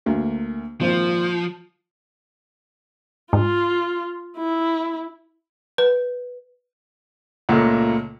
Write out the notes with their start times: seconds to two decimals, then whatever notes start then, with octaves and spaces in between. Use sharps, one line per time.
0.06 D2 A#3
0.81 G#1 A#2 F3 C4
3.33 G#2 F4
4.37 E4
5.78 B4
7.49 C#2 A#2 A3 A#3